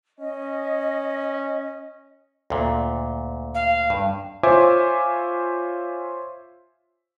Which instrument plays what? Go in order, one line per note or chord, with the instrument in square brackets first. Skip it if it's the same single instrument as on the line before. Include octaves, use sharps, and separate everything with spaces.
[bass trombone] C#4 [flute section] D#5
[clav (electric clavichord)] D2 A#2
[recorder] F5
[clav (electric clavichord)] G2
[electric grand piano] F4 C5 C#5 E5 G#5 D6